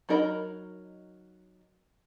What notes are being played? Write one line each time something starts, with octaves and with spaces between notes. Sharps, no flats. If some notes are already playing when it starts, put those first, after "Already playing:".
F#3 D#4 A#4 D#5 B5